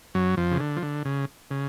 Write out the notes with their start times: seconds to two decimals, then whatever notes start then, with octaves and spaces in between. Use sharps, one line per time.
0.14 F#2 F#3
0.37 F2 F3
0.51 C#3
0.60 D3
0.77 F3
0.82 D3
1.05 C#3
1.51 C#3